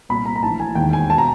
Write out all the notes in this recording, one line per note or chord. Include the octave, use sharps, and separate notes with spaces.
C2 A#2 B5
A#5
A#5
A#1 A2 E3 A5
G#5
E1 D#2 D#3 G5
G#5
A5
B2
A#5